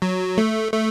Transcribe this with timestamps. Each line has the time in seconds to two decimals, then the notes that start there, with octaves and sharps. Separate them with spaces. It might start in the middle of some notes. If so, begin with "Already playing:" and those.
0.02 F#3
0.38 A3
0.73 A3